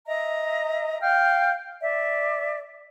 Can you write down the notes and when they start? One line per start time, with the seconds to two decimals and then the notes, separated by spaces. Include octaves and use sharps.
0.07 D#5 E5 A#5
1.02 F5 G5 F6
1.81 D5 E5